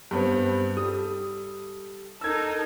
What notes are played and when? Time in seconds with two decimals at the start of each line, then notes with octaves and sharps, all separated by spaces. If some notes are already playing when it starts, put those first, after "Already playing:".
0.11 G2 B3 C4
0.77 G3 A4 D#6
2.21 D#4 A4 A#4 E6 G#6